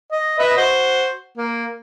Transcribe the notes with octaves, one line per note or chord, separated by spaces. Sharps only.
D#5
B4 D#5 E5
F#4 C5
A#3